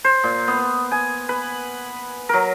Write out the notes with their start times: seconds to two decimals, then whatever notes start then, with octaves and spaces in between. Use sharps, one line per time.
0.04 C5
0.24 A#2
0.48 B3
0.91 G#5
1.29 B4
2.29 F#3 A#4